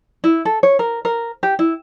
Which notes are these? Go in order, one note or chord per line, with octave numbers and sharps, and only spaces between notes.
E4
A4
C#5
A#4
A#4
G4
E4